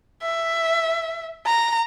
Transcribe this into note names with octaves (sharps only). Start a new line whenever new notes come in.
E5
A#5